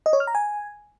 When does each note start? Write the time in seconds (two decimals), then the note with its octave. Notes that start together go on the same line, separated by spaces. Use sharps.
0.06 D#5
0.13 C#5
0.20 F6
0.27 A#5
0.35 G#5